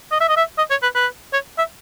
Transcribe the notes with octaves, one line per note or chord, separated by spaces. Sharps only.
D#5
E5
D#5
E5
D#5
C#5
B4
B4
C#5
E5